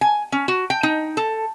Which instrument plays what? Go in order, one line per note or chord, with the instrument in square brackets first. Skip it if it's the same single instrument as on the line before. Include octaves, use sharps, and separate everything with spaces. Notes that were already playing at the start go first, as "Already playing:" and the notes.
[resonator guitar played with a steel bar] G#5
C#4
F#4
G5
D#4
A4